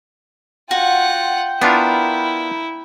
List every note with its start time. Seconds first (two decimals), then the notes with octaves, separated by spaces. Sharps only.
0.71 F4 F#4 F#5 G5
1.61 B3 D4 E4 F4 A#4